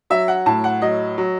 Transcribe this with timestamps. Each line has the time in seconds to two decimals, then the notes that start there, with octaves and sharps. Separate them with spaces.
0.10 F#3 E5
0.28 F#5
0.46 A2 A5
0.64 F#5
0.82 F#3 D#5
1.18 F#3